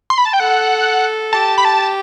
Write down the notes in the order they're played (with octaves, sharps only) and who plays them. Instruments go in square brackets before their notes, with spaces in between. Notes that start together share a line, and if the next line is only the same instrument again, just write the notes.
[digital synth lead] C6
B5
A5
G5
[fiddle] A4 [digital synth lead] F#5
[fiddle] G4 [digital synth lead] A5
[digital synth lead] B5
A5